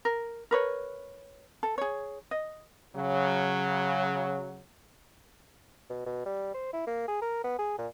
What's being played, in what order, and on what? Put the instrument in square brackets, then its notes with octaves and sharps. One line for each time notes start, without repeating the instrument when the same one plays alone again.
[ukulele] A#4
A#4 B4 C#5
A4
G#4 C#5
D#5
[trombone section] C#3 F#3
[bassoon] B2
B2
G3
C5
E4
A#3
G#4
A#4
B3
G#4
A#2